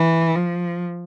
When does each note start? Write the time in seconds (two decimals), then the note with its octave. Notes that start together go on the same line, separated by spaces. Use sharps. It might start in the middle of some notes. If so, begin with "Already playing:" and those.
Already playing: E3
0.35 F3